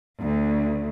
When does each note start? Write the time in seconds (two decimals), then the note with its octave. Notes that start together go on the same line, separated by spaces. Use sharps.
0.20 D2